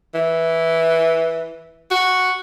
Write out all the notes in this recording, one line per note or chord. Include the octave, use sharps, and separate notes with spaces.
E3
F#4